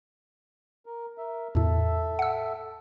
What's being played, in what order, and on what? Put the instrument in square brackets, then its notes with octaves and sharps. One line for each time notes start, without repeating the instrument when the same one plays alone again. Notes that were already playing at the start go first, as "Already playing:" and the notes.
[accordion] A#4
A#4 E5
[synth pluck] E2 A2 [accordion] A4 E5
[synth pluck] F#5 E6